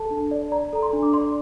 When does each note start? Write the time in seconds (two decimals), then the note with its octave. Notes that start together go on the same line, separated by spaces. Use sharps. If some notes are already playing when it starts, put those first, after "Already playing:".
Already playing: A4 A5
0.10 D4
0.31 D5
0.52 D5 A#5
0.73 A4 A#5
0.82 C6
0.93 D4
1.03 D6
1.13 D5 C6